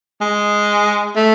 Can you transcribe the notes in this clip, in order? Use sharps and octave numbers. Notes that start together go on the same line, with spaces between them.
G#3
A3